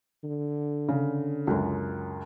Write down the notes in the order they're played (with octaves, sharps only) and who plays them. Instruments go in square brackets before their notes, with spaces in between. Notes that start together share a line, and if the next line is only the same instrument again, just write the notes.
[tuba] D3
[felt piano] C#3
C#2 F#2